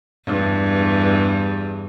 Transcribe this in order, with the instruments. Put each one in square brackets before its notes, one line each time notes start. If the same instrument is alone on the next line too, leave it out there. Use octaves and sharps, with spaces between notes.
[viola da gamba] E2 G2